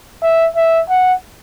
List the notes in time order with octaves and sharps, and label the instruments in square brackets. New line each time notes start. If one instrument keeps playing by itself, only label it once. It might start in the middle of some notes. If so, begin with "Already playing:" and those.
[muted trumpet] E5
E5
F#5